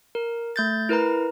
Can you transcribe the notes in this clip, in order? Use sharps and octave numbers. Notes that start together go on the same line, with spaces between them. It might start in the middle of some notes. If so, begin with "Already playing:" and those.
A#4
A3 G6 A6
E4 A#4 B4 A#5